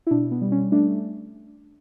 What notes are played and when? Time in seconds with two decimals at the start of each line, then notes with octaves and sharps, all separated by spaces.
0.07 E4
0.10 B2 D4
0.31 B3
0.42 G3
0.52 C#4
0.72 A3 D4